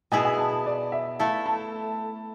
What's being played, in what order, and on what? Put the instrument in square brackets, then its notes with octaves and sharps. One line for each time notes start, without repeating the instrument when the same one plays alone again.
[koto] B2 B3 E4 G#4 [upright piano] G#5
[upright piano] G#5
A5
A5
D5
E5
[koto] A3 E4 A4 [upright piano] F5
[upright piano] A5